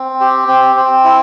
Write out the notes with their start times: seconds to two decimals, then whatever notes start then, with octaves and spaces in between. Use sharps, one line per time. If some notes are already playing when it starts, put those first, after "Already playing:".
Already playing: C4
0.20 G4
0.48 C4
0.76 C4
1.05 E4